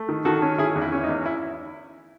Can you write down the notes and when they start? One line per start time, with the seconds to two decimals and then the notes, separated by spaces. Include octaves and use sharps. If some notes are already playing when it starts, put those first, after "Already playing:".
Already playing: A3
0.09 D#3
0.25 D#3 F#4 A4
0.42 C#4
0.58 D#3 E4 G#4
0.76 E2
0.81 E4
0.92 C#4
1.04 D#4
1.09 E2
1.26 E4